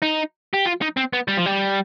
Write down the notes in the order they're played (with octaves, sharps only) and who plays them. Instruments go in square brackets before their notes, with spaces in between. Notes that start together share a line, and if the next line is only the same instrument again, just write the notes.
[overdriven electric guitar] D#4
G4
F4
D#4
C4
B3
G3
F3
G3